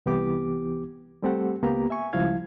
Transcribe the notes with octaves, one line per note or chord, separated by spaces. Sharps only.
C2 E3 B3 G4 D6
G3 A3 C4 G4 A4 F#5
C#2 A#3 B3 G4 A#5
E5 G#5 C#6
C#2 F3 G3 E4 F5 G#6